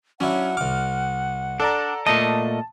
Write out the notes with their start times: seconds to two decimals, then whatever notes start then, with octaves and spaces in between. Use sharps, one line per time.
0.20 F#3 C#4 D4 E4 F#5
0.57 C2 D6 F6
1.60 D4 A4 D5 A#5
2.07 A#2 A3 D#5 A5 D#6